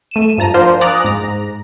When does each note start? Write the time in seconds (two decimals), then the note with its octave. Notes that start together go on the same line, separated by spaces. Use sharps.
0.11 A3 D#7 E7
0.38 G2 F3 A5 A#5
0.54 F3 D4 F4 A#4 C5 F5
0.81 G#5 A#5 D6 D#6 F#6 A6
1.04 G#2 A#5